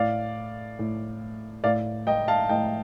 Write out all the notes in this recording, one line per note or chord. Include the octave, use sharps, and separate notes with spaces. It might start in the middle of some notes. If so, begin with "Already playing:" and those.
Already playing: A2 D5 F5
A2
A2 D5 F5
D#5 G5
F5 A5
A2 D#5 G5